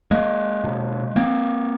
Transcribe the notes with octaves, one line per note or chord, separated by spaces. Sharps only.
G#3 A#3
B2
A#3 C4